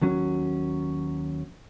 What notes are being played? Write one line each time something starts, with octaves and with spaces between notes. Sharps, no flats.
D#2 F#3 C#4